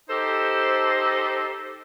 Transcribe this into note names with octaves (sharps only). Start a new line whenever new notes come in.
D#4 G4 A4 C5